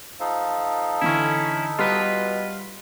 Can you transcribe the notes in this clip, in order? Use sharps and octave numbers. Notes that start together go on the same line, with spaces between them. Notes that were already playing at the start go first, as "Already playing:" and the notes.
F3 D#4 A4
D3 E3 C#4 E4
B2 G3 F4 B4